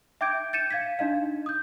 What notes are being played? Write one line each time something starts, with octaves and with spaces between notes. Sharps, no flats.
E5 G5 D6 G6 G#6 D7
G6 A6 C#7 D#7 E7
F5 G#6 B6
D4 D#4 D#5 F5
D#6 G6